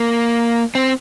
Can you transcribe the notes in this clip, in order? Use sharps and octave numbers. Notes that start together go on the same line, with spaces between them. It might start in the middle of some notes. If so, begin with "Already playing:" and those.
Already playing: A#3
C4